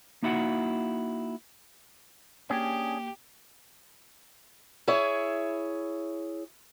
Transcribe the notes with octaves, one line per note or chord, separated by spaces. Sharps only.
A#3 D#4 E4 F#4 F#5
A#3 C#4 D4 G4 G#4
E4 G#4 C#5 E5